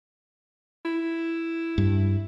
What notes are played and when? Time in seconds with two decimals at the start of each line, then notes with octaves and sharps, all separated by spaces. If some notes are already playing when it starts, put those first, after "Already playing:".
0.85 E4
1.78 G2